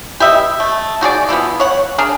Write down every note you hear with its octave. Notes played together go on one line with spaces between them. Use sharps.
G4 B4 D#5 E5
A3
D#4 F#4 G#4 D5
D3 E3 F3 B3
C#5 F#5
D4 G#4 A#4